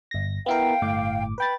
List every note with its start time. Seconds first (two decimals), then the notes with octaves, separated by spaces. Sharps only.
0.11 G1 A#6
0.46 B3 E4 A#4 F5 G5
0.82 G1 A2 D6
1.38 B4 G5 B5 A6